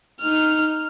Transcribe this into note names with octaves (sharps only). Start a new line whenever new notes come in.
D#4 F6